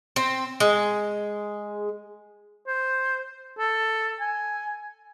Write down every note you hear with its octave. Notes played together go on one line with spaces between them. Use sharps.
C4
G#3
C5
A4
G#5